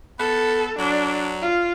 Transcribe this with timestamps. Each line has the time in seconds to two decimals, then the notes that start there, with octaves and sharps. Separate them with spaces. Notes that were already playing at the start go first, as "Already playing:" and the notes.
0.19 B3 A4
0.78 F#3 D4
1.41 F4